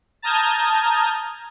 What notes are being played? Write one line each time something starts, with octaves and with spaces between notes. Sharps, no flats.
A5 A#5 D#6 F6 G6 G#6